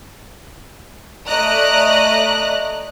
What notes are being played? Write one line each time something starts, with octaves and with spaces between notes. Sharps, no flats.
A3 D5 D#5 A#5 F#6